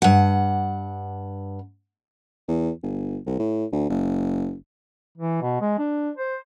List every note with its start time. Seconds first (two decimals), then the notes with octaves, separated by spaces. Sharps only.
0.02 G2 F#5
2.48 E2
2.83 G1
3.26 C2
3.39 A2
3.72 D2
3.89 F#1
5.17 E3
5.41 B2
5.61 G#3
5.78 D4
6.17 C5